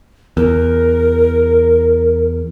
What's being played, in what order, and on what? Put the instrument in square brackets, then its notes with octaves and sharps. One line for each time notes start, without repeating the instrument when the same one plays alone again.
[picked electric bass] E2 [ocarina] A#4